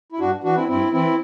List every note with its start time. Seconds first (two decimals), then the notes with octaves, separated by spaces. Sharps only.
0.12 E4
0.19 G2 D4 F#4
0.44 E3 D4 F#4
0.56 C4 E4
0.68 G2 C4 E4
0.92 E3 C4 E4